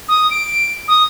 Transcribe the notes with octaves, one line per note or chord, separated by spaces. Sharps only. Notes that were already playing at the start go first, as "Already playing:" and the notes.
D#6
D7
D#6